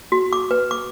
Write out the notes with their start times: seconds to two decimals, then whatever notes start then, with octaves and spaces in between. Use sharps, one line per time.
0.12 F#4
0.33 D6
0.51 B4
0.71 D6